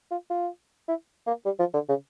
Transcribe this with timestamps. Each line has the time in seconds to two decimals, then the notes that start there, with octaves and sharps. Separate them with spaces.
0.11 F4
0.30 F4
0.88 E4
1.27 A#3
1.45 G3
1.59 F3
1.74 D3
1.89 C#3